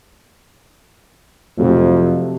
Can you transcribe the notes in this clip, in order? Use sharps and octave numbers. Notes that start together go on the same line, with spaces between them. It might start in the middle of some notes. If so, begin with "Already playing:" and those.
F2 C3 F#3 A3